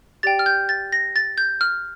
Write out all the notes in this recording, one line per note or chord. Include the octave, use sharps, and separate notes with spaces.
G4 D5 G5 A6
F6
G6
A6
A#6
A6
G6
F6